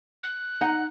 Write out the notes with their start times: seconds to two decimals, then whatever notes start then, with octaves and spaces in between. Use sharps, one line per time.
0.23 F#6
0.61 D#4 F#5